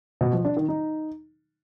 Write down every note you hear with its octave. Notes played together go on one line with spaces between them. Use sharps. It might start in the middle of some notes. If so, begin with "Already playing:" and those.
B2
F3
D4
D#3
D#4